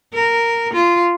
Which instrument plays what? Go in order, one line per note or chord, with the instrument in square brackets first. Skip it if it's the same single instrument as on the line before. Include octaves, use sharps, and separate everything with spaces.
[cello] A#4
F4